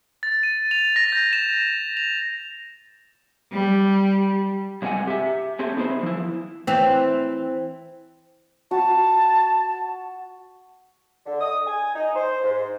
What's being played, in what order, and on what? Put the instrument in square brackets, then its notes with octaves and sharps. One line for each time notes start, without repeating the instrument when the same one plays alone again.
[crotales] A6
D#7
F7
A#6
G6
E7
F7
[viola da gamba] G3
[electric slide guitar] G2 C3 G#3 G#4 F#5 G#5
G4 E5
A3 C4 G4 G#4
B3 D#4 E4 G#4 A4 C5
F3 E4
[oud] E3 C4
[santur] F#4 [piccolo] A5
[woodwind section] D3
D#6
G#5
D#4
C5
G#2